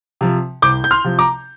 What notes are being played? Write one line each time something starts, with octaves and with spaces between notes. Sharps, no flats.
C3 F3
C2 D6 G6
G6
C6 F6
C3 F3
A#5 D6